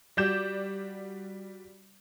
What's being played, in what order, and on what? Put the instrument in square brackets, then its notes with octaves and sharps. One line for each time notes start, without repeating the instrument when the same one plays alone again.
[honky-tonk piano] G3 F#4 D5 G6 E7